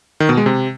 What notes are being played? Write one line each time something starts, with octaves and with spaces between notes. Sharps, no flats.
D#3
B2
G#3
C3